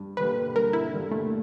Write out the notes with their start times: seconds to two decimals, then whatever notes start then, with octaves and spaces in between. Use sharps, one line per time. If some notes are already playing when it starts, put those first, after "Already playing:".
Already playing: G2
0.17 D3 G3 A#3 B4
0.55 G2 A#4
0.73 E4
0.92 D3 G3 A#3
1.11 A3